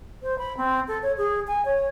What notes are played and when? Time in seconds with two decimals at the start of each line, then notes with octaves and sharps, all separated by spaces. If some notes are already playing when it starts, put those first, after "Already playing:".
0.23 C5
0.38 B5
0.57 C4
0.88 A4
1.03 C#5
1.18 G#4
1.47 G#5
1.65 C#5